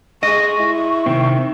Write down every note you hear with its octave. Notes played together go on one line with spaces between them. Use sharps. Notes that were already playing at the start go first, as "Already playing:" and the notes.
G#3 D#5 C#6
E4
C3 D#3 C4